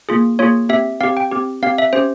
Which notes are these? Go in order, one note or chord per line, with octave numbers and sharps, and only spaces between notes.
A#3 F4 G#4
A#3 F4 G#4 C#5
C4 G4 E5
C4 G4 F5
G5
C4 G4
C4 G4 F5
E5
C#4 G4 C5